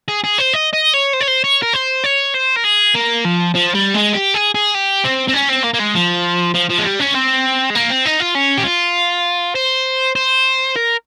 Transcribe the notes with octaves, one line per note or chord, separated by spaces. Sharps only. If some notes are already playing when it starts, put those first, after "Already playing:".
G#4
G#4
C5
D#5
D#5
C#5
C5
C#5
C5
C#5
A#4
C5
C#5
C5
A#4
G#4
A#3
F3
F3
G3
G#3
G4
G#4
G#4
G4
C4
C4
C#4
C4
A#3
A#3
G#3
F3
F3
F3
G#3
G3
C#4
C4
G#3
A#3
C4
D#4
F4
C#4
G4
F4
C5
C5
A#4